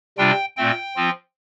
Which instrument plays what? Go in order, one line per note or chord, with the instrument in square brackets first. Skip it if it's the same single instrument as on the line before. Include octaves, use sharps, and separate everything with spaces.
[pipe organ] C3 G3 D4 F4 G5
A#2 A3 C4 G5
F3 C4 F4